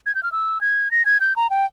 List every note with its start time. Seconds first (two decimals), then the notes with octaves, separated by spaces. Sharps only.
0.06 G#6
0.15 G6
0.23 F6
0.32 E6
0.61 G#6
0.91 A#6
1.05 G#6
1.20 G6
1.36 A#5
1.50 G5